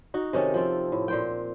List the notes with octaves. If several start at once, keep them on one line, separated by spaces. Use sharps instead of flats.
D#4 F#4
C3 D#3 C#4 A4
F3 C4
A2
A#2 C5 G5